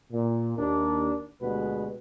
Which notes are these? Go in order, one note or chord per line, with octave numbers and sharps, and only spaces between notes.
A#2
D#2 D4 A#4
D2 B2 G3 G#3 B3 B4